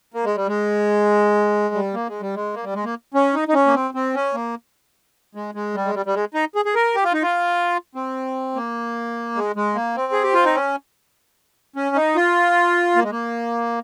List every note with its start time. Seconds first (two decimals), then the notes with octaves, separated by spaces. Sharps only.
0.14 A#3
0.25 G#3
0.36 G3
0.48 G#3
1.74 G3
1.94 A#3
2.08 G#3
2.21 G3
2.35 G#3
2.54 A#3
2.63 G3
2.74 G#3
2.84 A#3
3.14 C#4
3.34 D#4
3.48 D#4
3.54 C#4
3.66 A#3
3.74 C4
3.94 C4
4.15 C#4
4.34 A#3
5.35 G#3
5.55 G#3
5.74 G3
5.85 G#3
5.95 G3
6.06 G3
6.14 G#3
6.34 D#4
6.55 G#4
6.65 G#4
6.75 A#4
6.95 G4
7.04 F4
7.14 D#4
7.22 F4
7.95 C4
8.55 A#3
9.35 G#3
9.56 G#3
9.75 A#3
9.96 C4
10.12 G#4
10.23 G4
10.34 F4
10.45 D#4
10.55 C#4
11.76 C#4
11.96 D#4
12.16 F4
12.96 A#3
13.03 G#3
13.11 A#3